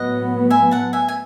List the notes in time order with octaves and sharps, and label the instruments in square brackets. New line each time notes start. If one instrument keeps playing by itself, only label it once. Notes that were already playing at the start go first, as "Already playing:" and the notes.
Already playing: [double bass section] A2 F#3 B3 [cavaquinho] D#5 F#5
[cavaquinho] E5 G#5
F#5 A5
E5 G#5
G#5